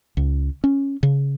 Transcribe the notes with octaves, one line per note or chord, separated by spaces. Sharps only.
C#2
C#4
C#3